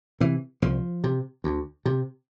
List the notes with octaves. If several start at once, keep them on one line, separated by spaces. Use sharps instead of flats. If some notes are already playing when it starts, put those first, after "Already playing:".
C3 E3
C2 F3
C3
D2
C3